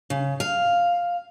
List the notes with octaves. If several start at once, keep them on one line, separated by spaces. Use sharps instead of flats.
C#3
F5